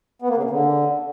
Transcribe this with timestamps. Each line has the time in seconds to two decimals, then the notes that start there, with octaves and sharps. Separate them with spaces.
0.22 B3
0.29 A#3
0.36 C#3
0.43 C3
0.50 D3